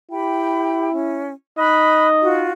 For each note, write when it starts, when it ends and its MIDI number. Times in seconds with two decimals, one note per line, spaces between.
0.10 1.31 64
0.10 0.91 67
0.10 0.91 79
0.10 0.91 83
0.91 1.31 61
1.58 2.51 63
1.58 2.43 75
1.58 2.08 83
1.58 2.08 90
2.22 2.52 65
2.22 2.52 66